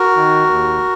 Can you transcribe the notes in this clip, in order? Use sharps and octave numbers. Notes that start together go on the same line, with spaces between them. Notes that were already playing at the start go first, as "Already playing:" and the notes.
Already playing: F#4 A#4
D#3
D#2